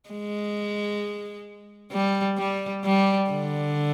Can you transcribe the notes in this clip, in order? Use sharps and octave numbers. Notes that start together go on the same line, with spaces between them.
G#3
G3
G3
G3
D3